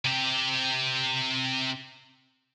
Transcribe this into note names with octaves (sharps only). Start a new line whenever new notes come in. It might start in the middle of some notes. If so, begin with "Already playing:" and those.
C3 G4